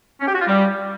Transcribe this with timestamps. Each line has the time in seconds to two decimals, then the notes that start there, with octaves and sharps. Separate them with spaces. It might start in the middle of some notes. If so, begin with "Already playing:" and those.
0.20 C#4
0.27 G4
0.33 F#4
0.40 F4
0.46 G3